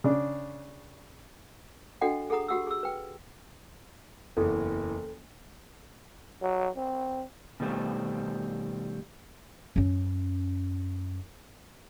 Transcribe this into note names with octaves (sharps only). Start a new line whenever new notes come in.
C#3 D4
D4 F#4 A4 D#5 F#5 G5
G#4 A4 F#5 A#5 D#6
F#4 G4 F#5 D#6 E6
G#4 E6
B4 G5
F#1 E2 E3 A4
F#3
C4
B2 D#3 G3 A3 C4
F#2 C#4